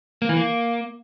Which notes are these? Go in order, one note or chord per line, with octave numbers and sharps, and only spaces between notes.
A#3
E3
A#3